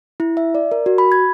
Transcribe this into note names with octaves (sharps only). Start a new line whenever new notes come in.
E4
E5
D5
A#4
F#4
B5
G#6